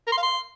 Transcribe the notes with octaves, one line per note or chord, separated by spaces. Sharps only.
A#4
C6
F5
C6